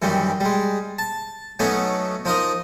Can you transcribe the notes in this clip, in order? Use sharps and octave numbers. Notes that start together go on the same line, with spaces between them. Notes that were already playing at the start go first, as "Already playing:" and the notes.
F#2 D#3 E3 G3
G3 G#3
A5
F#3 A3 B3 C#4 D#4
F3 D#4 A#4 D#5